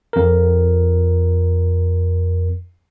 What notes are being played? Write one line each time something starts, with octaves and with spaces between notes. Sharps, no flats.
F2 A#4